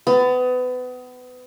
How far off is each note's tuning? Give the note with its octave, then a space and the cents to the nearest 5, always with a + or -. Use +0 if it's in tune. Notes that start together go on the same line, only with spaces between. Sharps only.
B3 +30